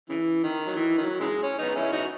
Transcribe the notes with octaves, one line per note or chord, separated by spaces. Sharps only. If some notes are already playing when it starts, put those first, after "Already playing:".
C#3 E3
D#3
F#3
E3
D#3 F#3
C#3 E3 G#3
C#4
B3 D#4
C#4 E4
D#4 F#4